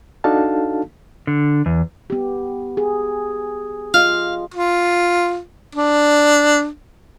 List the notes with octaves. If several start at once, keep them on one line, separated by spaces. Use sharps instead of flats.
D4 D#4 F#4 A4 F5 A5
D3
E2
B3 G4
G#4
F4 D#5 F5
F4
D4